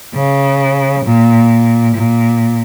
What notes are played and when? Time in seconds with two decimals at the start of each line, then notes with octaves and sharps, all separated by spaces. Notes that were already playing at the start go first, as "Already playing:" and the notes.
0.15 C#3
1.05 A#2
1.95 A#2